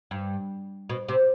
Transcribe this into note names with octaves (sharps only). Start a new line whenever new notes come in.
G2
B2
C3